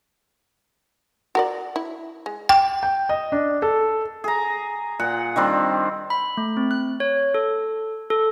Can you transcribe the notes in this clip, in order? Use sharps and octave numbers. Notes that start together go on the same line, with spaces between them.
F#4 A#4 D5
E4
G#3
G5
G5
D#5
D4
A4
G#4 A#5
A#2 F#5
D#3 G3 C4 D4
B5
A3
C4
F#6
C#5
A4
A4